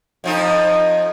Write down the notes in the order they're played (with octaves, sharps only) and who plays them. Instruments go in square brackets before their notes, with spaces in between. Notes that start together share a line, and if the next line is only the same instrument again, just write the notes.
[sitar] F2 F3 D#4